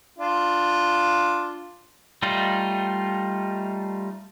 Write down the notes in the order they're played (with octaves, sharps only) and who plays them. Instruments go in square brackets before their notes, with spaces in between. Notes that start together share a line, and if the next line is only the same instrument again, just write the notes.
[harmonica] D4 F4
[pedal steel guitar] G3 A3 D#4 F4